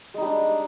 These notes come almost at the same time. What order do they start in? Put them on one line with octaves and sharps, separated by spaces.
G#3 D#4 G3 D4